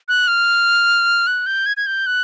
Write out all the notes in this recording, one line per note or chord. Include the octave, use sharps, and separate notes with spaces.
F#6
F6
F#6
G6
G#6
G#6
G6
F#6